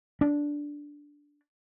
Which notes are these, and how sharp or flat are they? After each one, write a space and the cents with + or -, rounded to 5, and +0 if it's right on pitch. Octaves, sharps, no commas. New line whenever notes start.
D4 -5